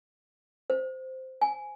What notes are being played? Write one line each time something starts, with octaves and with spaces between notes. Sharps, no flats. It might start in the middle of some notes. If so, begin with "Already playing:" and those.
C5
G#5